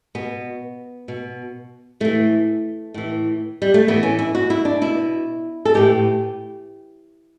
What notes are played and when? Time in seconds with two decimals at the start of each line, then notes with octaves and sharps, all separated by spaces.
0.15 B2 B3
1.08 B2
2.00 A2 E3 A3
2.94 A2 E3
3.62 G3
3.74 A3
3.88 A2 E3 B3
4.03 C#4
4.19 E4
4.35 F#4
4.50 E4
4.65 D4
4.81 B2 E4
5.65 A4
5.74 A2 E3 G4